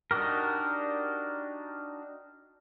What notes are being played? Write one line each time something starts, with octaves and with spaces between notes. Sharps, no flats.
D4 D#4 F#4 G4 A#4